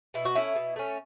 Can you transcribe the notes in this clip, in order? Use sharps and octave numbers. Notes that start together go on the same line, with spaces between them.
B2 E4
F#4
A3 C#4 E4
B2
A3 C#4